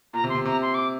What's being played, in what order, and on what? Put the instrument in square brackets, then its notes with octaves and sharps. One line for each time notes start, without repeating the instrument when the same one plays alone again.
[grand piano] A#2 [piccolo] A#5
[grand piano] C3
[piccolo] C6
[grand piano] C3
[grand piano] C3 [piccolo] A#5
[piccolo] C6
D6